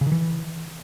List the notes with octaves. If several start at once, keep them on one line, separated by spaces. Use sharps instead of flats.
C#3
D#3
E3